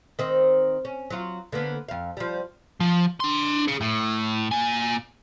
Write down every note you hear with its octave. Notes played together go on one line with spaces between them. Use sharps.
D#3 C4
C#4
F#3 F4
D3 A#3 B3
F2 F5
F3 G3
F3
D4 C6
G#4 C#5
A2
A#2 G#5